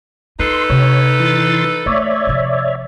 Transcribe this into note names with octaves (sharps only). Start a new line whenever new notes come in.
D#4 F4 A4 B4 C6
C3 C#5
E3 C6 A6
A3 C#5 D5 E5
C3 F3